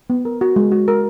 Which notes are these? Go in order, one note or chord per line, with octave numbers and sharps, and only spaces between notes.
B3
A#4
F#4
G#3
F#4
A#4